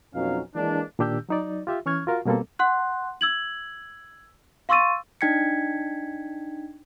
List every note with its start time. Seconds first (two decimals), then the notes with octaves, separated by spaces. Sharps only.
0.14 F2 B2 F#3 C#4 D#4 F5
0.55 E3 G#3 A#3 D4
0.99 A#2 D#3 D4 G4 E6 G6
1.29 F#3 D#4 D5
1.67 F4 G4 E5
1.86 E3 C#4 C#6 F6 G#6
2.07 F4 F#4 A#4 F5
2.25 B2 G3 A#3 C4 A4
2.59 F#5 C6 F#6
3.21 E6 G#6 F#7
4.69 F5 C6 C#6 E6 A6 D#7
5.21 D4 D#4 G5 G#6 B6 C#7